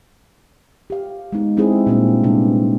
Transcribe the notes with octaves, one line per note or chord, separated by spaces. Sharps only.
G4 F5
G#3 B3 D#4
G#3 C4 D#4 E4 G#4
A#2 G3 A#3 C4 D4 F#4
C3 G3 G#3 B3 D4